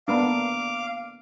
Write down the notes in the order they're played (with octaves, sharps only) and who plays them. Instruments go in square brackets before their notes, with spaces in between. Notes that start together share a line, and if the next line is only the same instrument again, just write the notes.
[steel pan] A#3 B3 D4 [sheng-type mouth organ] F5 D6